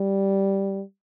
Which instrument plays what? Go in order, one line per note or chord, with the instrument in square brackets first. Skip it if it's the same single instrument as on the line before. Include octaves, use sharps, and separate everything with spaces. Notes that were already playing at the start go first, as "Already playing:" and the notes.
Already playing: [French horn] G3